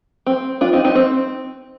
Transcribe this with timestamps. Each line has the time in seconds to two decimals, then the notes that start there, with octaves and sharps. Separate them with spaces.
0.26 C4
0.61 D4 F4
0.73 C4 D#4
0.84 C4 D#4
0.95 C4